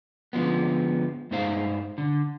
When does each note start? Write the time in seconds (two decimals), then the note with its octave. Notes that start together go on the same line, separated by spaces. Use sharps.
0.33 D3 F3 G#3 B3
1.31 G2 G#3 A3 D#4 C5 F5
1.98 D3